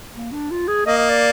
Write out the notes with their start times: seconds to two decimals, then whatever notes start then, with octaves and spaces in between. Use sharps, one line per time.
0.14 A#3
0.32 D4
0.51 F4
0.68 G#4
0.86 A#3 D#5
0.97 D#5
1.09 D5